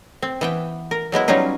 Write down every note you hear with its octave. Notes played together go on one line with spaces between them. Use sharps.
C4
E3 B3 G5
A#4
F#3 G#3 B3 E4
F#3 G3 C#4 D#4 F4